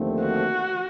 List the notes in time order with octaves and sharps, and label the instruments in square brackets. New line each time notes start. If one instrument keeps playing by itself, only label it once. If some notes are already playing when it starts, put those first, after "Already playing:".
Already playing: [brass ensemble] D#2 D3 F3 A3 C4
[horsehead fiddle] F#4